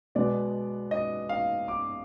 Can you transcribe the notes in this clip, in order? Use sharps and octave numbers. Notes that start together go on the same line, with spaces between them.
B2 G#3 B3 D5
D#5
F5
D6